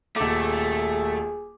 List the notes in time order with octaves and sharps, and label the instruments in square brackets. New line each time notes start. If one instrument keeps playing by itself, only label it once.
[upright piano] D#1 D6 [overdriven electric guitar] A3 [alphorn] G#4